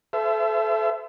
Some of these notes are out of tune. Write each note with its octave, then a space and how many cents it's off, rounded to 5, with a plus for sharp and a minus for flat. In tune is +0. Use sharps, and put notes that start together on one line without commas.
A4 -30 C5 -30 E5 +25